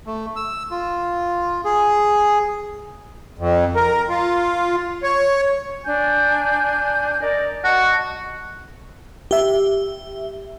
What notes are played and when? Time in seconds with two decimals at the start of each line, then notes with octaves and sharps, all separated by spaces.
0.06 A3
0.36 E6
0.71 F4
1.64 G#4
3.39 F2
3.76 A#4
4.09 F4
5.03 C#5
5.85 D4 G#5 G6
7.20 A#4 D5 D#5
7.64 F#4 D#5 F#5 A5
9.31 G4 E5